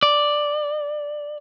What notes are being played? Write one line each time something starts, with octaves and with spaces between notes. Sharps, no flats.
D5